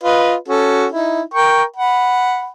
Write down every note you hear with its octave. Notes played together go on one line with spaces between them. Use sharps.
F4 B4 D#5
C#4 F#4 A4
D#4 E4
A#4 G5 C#6
F#5 B5